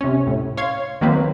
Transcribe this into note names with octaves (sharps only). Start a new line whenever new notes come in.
C3 C#4
A2
C#5 F5 C6 G#6
D#3 F#3 A#3 C4 B4 C5